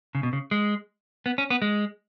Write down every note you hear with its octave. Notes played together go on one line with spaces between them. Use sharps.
C#3
B2
C#3
G#3
B3
C#4
B3
G#3